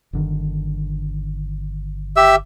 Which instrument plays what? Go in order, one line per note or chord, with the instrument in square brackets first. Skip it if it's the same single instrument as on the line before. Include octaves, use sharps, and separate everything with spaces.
[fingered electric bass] G1 D3 D#3
[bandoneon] G4 E5 E6